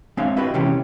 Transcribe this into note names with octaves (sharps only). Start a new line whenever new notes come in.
G#3 C4 D4 C#5 E5 F5
E4 F#4 G4 B4 D#5 E5
C3 E3 G#3 C#4 G4